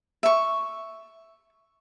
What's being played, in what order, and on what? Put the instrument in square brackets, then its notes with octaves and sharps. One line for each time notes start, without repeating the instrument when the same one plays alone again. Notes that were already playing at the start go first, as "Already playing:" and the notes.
[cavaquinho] E5 C#6